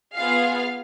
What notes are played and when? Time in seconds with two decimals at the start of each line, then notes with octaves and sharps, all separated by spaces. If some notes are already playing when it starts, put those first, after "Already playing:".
0.14 B3 F4 G#4 F5